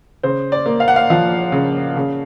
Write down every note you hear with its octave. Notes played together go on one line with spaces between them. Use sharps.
C#3 C5
D5
A#3
F5
F#5
F5
F3 F5
C#3
C#3